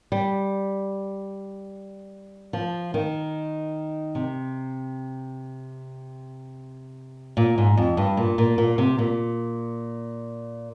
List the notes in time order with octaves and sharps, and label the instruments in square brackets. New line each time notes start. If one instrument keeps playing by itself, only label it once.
[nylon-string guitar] G3
F3
D#3
C3
A#2
G#2
F2
G2
A#2
A#2
A#2
C3
A#2